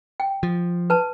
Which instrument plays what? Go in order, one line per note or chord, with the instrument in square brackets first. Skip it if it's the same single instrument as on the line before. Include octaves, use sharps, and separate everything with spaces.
[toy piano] G5
[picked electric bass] F3
[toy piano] B4 A5